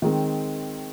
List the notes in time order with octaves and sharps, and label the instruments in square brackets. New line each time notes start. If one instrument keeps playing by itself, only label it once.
[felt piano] D#3 G#3 C4